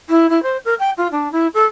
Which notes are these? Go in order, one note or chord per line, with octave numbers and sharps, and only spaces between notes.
E4
E4
C5
A#4
G5
F4
D4
E4
A4